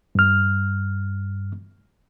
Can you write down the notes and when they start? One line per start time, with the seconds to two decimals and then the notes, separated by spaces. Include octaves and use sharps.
0.15 G2 F6